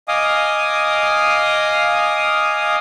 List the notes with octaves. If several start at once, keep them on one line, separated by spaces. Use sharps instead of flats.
D#5 F5 G#5 D6 D#6